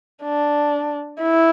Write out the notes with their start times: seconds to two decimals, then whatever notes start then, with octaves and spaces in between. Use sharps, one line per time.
0.23 D4
1.22 E4